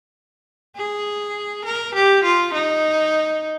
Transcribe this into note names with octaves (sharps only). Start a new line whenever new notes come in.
G#4
A#4
G4
F4
D#4